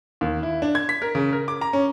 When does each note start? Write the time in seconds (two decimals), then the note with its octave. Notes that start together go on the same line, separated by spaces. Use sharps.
0.21 D#2
0.43 E4
0.62 D4
0.75 G#6
0.89 B6
1.02 A#4
1.15 C#3
1.32 A#4
1.48 D6
1.61 A#5
1.73 C#4